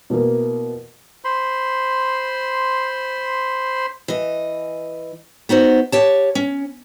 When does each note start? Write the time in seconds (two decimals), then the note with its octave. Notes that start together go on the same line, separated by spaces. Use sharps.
0.10 B2 E3 A#3
1.24 C5 B5 C6
4.08 E3 D#5
5.49 B3 D#4 F#4 C5
5.92 G4 C#5 A5
6.35 C#4